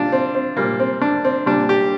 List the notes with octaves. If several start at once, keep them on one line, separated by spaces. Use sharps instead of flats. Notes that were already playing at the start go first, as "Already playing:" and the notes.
Already playing: A#2 G3 D4 F4
C4
C4
A#2 G3 A#3
C4
D4
C4
A#2 G3 D4
G4